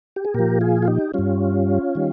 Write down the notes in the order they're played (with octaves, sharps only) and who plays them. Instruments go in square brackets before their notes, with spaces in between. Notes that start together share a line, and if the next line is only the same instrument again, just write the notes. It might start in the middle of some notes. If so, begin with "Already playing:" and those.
[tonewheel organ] G4
G#4
A#2 F3 G4 A#4
F4 G#4
F4
D#4 G4
G2 G3 C#4 F4
D#3 G3